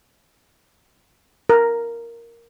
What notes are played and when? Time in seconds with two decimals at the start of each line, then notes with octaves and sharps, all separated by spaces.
1.50 A#4